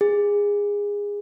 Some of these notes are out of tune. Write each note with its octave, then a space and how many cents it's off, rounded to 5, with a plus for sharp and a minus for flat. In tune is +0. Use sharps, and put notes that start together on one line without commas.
G#4 -20